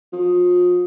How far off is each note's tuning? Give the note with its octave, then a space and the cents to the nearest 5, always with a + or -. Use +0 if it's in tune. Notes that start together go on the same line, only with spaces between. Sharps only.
F3 +35